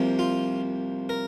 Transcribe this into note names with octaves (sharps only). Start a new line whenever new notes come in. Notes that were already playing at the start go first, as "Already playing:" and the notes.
Already playing: C2 C3 F3 A#3
F4
A#4